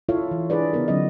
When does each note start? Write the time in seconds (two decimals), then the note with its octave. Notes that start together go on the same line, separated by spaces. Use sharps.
0.09 E4 F4 A4 C#5 E5 F5
0.31 E3
0.50 D4 E4 G#4 B4 D5
0.73 C#3 B3 D#4 A#4
0.88 D3 F#3 C#4 D#5